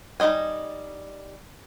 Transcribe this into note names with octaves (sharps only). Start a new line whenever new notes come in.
G3 D#4 E4 D#5 G#5